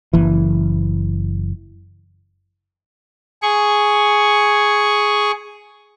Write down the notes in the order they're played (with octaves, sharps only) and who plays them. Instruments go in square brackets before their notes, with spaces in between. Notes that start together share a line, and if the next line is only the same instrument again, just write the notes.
[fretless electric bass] F#1 E3
[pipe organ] G#4 C#6